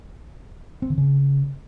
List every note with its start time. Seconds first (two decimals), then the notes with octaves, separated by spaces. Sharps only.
0.82 C4
0.90 D3
0.98 C#3